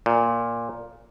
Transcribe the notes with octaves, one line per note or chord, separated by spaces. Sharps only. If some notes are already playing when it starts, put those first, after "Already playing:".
A#2